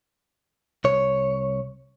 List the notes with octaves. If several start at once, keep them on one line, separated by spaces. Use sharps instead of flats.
C2 C#5